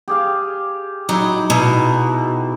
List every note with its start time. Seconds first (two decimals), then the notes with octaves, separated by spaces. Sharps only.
0.08 G4 G#4 F5
1.09 F#3 D#4 E4
1.50 B2 D#4 E4